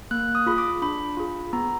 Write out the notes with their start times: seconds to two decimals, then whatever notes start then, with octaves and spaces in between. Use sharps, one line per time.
0.11 A#3 F#6
0.35 D#6
0.46 F4 G#4 B5
0.58 D6
0.82 D4 B5
1.17 F4 G#4
1.53 B3 A#5